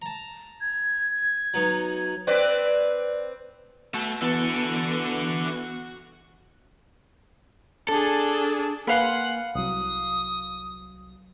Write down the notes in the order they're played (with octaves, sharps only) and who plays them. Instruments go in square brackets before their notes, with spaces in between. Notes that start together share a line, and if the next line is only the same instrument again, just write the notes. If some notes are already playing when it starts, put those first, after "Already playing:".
[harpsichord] A5 A#5
[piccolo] G#6
[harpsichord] F#3 B3 D#4
[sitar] C4 B4 D5
[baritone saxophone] B2 [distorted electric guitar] A3 A5
[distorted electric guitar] D3 A4 [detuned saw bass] E3 [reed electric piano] B3 [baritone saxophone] F#4
[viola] D4 G#4 [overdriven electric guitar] A4
[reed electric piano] A#3 G#5 [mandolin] B4 F5 C6 [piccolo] F#5
[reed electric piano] C2 F#3 [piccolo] D#6